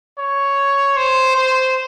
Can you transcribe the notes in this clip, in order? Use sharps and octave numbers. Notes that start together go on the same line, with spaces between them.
C#5
C5
C5